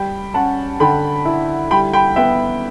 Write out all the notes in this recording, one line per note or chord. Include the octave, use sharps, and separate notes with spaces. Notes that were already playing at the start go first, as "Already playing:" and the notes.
Already playing: G3 G5 B5
C#4 F#5 A5
D3 G5 B5
E4
G3 G5 B5
G5 B5
B3 E5 G5